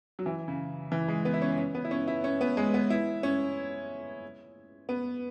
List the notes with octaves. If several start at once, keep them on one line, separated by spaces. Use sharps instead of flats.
F#3
E3
C#3
E3
G#3
B3
E4
C#4
C#4
B3
E4
C#4
E4
C#4
B3
G#3
B3
E4
C#4
B3